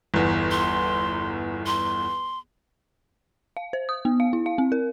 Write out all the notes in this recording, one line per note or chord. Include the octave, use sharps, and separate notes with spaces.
G1 E2
C6
C6
F5
C5
D#6
B3
F5
E4
F5
C4
A#4